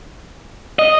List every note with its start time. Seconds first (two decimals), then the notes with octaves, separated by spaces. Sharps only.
0.79 D#5